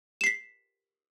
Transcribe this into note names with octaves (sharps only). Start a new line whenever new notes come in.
B6 C7 E7